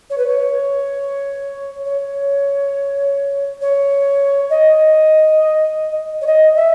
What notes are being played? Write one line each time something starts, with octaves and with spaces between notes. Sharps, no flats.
C#5
B4
C#5
C#5
C#5
D#5
C#5
D#5
E5